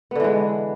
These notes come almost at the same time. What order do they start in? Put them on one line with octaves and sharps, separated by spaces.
B3 D3 E3 G#3